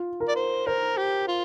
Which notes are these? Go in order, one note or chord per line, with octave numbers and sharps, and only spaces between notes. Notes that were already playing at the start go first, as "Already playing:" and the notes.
Already playing: F4
A#4
D5
C5
A#4 C5
G4
F4